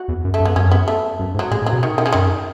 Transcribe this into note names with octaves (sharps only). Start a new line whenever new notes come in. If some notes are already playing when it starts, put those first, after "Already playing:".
Already playing: F#4
E2
F#2
A3
F#2
B3
F#2 C#4
B3
A3
F#2
G#2
F#3
A2 G#3
A2
F#3
B2
D#3
D#3
C#3
F#2 D#3